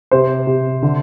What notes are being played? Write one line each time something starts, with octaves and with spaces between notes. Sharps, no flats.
C3 C5
C3
D3